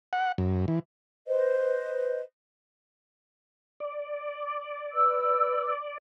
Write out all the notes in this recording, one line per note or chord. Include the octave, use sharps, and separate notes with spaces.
F#5
F#2
E3
B4 C5 D#5
D5
B4 E6